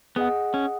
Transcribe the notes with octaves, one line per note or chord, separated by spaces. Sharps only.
B3 G#4 D#5 F#5
C#4